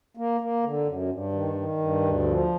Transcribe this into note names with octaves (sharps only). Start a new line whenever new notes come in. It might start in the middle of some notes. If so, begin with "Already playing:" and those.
A#3
A#3
D3
F#2
G2
D#3
D#3
G2
D2
F3